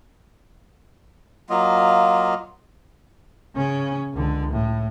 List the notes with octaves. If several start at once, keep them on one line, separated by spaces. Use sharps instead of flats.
F#3 A#3 F4 D#5
C#3 C#4
C#2 D3
A2